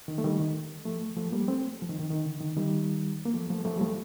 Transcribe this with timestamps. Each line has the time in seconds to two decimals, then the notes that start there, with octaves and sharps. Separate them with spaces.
0.08 D#3
0.18 A3
0.24 D#3 G3
0.39 D#3
0.85 F3 A3
1.17 F3 A3
1.32 G3 A#3
1.48 A3 C4
1.82 F3
1.89 D#3
2.00 D#3
2.10 D#3
2.26 D3
2.41 D#3
2.57 D#3 G3
3.25 A#3
3.34 F3 A3
3.49 F3 A3
3.65 F3 A3
3.77 G3
3.81 F3 A3